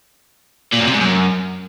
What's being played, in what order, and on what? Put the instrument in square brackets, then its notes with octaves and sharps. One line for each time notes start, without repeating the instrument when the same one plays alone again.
[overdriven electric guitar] A#2
F#2
C3
G#2
F#2